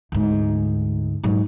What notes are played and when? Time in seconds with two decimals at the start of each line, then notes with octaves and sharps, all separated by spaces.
0.12 D2 G#2
1.23 G#2 F#3